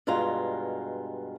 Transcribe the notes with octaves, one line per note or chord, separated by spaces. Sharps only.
G2 B2 G#3 F4 A#5